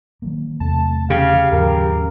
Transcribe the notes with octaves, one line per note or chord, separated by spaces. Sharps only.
D#3 F#3 A#3
E2 C3 A3 A5
C#3 G4 F5
D#2 G#2 F3 A#4